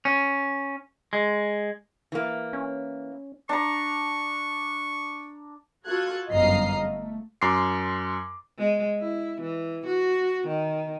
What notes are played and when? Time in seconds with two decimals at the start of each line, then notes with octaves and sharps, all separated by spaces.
0.05 C#4
1.13 G#3
2.12 E3 A#3
2.53 C#4
3.49 D4 A#5 C#6
5.87 F4 F#4 A4 F#6 G#6
6.31 G1 F#2 D#5 F5 A#5 C7
6.82 A3
7.42 F#2 C6 D6 C7
8.59 G#3
8.99 E4
9.41 E3
9.86 F#4
10.47 D#3